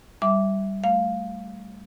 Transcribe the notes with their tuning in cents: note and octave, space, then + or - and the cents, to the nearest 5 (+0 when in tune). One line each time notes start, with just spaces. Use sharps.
G3 -5 E5 +0 D6 -10
A3 +5 F5 +0